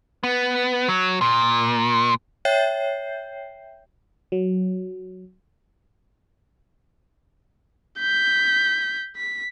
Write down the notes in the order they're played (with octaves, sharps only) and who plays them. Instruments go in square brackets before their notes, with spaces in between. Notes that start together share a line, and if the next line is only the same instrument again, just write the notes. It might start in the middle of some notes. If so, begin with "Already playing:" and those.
[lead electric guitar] B3
F#3
A#2
[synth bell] C#5 E5 G5 G6 C7
[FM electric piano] F#3
[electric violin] G6 B6
B6